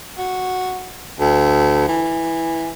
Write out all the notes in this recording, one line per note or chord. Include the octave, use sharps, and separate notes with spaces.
F#4
D2
E3